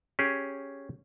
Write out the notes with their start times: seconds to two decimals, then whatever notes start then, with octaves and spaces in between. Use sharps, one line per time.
0.19 C#4 G4 G#4